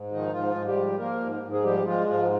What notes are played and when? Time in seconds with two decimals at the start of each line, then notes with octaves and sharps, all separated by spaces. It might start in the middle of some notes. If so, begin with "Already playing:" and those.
Already playing: G#2
0.11 D#3 F3 D#4
0.33 G#2 F3 F4
0.55 G#2
0.66 G3 G4
0.77 F3
0.98 F3 A#3 A#4
1.20 G#2
1.42 G#2
1.52 G#4
1.63 F3 G3 G4
1.85 F3 G#3 F4
2.07 G#2 F3 F4